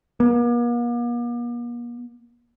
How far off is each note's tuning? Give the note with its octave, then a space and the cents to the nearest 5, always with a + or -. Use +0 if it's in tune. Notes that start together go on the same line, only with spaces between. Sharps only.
A#3 +45